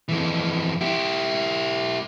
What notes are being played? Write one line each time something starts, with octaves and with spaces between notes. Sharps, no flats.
F2 E3
E4 G4